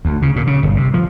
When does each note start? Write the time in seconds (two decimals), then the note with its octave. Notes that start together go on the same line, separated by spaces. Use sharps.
0.05 D2
0.22 C#3
0.36 A#2
0.47 C#3
0.63 G1
0.77 C3
0.94 F3